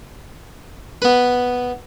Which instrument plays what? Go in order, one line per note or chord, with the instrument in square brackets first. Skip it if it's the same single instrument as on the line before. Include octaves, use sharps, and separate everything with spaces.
[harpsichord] B3 B4